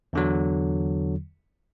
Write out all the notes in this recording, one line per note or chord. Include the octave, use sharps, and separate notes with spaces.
E2 D3 F#3